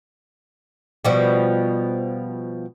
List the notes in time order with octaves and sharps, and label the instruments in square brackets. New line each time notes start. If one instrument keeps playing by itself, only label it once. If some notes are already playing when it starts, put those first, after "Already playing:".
[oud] B2 F3 G3